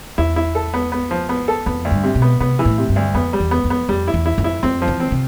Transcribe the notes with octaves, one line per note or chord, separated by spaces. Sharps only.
E2 E4
E4
A4
B3
B3
F3
B3
A4
F2 B3
D2
G2
C3
B2
B3
C3 B3
E3
A2
C3
G2
D2
F2 B3
G3
E2
B3
F2
B3
F2 G3
E4
E2
E4
F2
E4
F2 C4
F3
E3
C4
C3